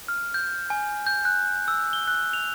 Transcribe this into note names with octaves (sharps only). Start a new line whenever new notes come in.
F6
G6
G#5
G6
F#6
E6
G7
F#6
F7